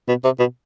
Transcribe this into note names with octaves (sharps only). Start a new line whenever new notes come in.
B2
C3
B2